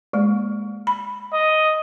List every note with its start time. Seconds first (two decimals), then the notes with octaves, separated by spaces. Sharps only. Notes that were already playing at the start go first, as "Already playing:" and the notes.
0.13 G#3 A#3
0.87 B5
1.33 D#5